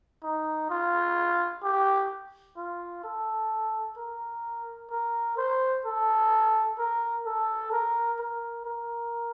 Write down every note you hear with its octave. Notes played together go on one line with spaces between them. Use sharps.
D#4
F4
G4
F4
A4
A#4
A#4
C5
A4
A#4
A4
A#4
A#4
A#4